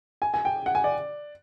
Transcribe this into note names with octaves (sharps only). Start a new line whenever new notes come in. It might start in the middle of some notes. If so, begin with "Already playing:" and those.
G#5
G#5
G5
F#5
G#5
D5